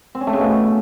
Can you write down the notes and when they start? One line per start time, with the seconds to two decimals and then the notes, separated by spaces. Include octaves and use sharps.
0.15 C4
0.21 C#4
0.27 A3
0.33 C#3
0.39 B2